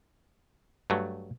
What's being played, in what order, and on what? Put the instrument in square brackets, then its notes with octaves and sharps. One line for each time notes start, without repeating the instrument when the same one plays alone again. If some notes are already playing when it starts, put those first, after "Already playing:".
[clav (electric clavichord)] G2 F#3 A3